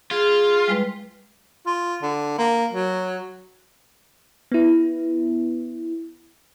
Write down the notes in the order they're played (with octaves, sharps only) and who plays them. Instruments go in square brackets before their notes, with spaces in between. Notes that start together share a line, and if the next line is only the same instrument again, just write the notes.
[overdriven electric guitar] F4 [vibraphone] G#4
[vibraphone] G3 G#3 B4
[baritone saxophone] F4
D3
A#3
F#3
[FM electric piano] B3 E4